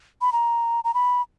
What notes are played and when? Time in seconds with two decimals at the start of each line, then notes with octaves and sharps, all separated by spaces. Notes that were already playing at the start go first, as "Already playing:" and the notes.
0.21 B5
0.33 A#5
0.84 A#5
0.94 B5